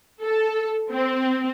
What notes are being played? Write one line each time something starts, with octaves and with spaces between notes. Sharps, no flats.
A4
C4